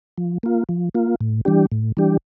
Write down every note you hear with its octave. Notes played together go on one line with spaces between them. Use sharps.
F3
A#3 F4
F3
A#3 F4
A2
E3 G3 D4 G4
A2
E3 G3 D4 G4